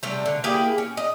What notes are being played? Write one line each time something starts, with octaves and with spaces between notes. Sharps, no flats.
C3 G3 A3
D3
A#3 E4 G4 G#4
C#4
D#5